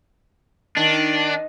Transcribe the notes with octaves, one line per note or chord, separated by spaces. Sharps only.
D#3 D4